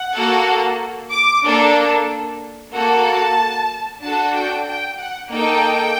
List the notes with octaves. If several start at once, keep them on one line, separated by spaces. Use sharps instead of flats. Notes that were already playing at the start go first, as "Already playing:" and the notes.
Already playing: F#5
A#3 F#4 A4
D6
A#3 D4 A4
A#3 F#4 A4
A5
D4 F#4 A4 A5
G5
G5
F#5
A#3 D#4 A4 G5